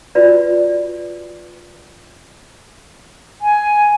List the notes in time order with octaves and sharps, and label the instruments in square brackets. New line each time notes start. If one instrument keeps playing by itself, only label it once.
[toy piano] F4 F#4 B4 D5
[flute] G#5